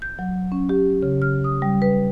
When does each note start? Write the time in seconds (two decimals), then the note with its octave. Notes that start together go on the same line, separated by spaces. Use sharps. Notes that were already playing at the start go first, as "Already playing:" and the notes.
0.02 G6
0.19 F#3
0.52 C#4
0.69 G4
1.03 C#3
1.22 F6
1.44 D#6
1.62 G3
1.82 B4